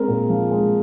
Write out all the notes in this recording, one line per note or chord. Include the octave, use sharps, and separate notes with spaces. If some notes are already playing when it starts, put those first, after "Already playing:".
Already playing: G#3 C4 A#4
A#2
F3
G#3